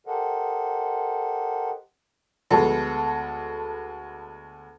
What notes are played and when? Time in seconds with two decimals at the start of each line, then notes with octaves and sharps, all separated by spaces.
0.07 G4 A4 A#4 C5 D#5 F#5
2.51 D2 G#3 B3 A4